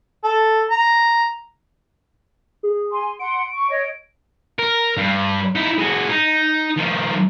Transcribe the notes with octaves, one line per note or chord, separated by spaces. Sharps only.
A4
A#5
G#4
G#5 C6
F#5 C6 D7
C#6
C#5 D#5
A#4
G2
D#4 E4
G#3 F#4
D#4
D#3 F3